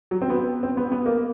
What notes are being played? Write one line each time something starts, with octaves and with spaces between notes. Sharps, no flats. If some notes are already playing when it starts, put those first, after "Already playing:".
F#3
C4
B3
C4
B3
B3
A#3